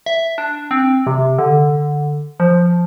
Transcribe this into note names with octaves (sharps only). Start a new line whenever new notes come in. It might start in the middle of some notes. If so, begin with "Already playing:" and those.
E5
D4
C4
C3
D3
F3